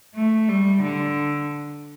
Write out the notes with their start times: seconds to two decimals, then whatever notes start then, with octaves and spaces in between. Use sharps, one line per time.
0.15 A3
0.48 G3
0.83 D3